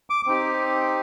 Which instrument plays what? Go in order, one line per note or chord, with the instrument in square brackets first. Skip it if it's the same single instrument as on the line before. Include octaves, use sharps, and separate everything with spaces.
[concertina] D6
C4 D#4 G4